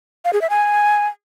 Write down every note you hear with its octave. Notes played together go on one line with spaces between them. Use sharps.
F5
G#4
E5
G#5